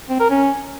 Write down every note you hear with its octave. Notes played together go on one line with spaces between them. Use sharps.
C4
A#4
C#4